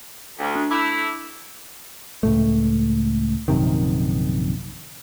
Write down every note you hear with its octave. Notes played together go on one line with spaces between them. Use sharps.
D2
D4
A3 E4 D6 E6
C#2 A2 A3
A#1 F#2 C3 D#3